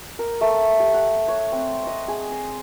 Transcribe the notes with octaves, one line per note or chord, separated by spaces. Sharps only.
A#4
A3
G4
F#5
C#5
C4
D#5
G#4
C6